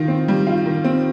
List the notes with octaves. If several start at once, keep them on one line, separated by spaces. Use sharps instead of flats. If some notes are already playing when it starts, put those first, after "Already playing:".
Already playing: D#3 F4
C4
G3
F4
D#3
C4